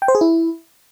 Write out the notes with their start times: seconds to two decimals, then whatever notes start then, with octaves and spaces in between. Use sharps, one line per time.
0.02 G5
0.08 C5
0.15 G#4
0.21 E4